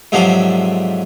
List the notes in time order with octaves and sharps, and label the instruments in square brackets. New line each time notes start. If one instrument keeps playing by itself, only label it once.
[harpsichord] G#2 C3 F3 F#3 D4 A4